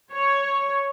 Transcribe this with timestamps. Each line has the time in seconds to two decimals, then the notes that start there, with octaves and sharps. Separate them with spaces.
0.12 C#5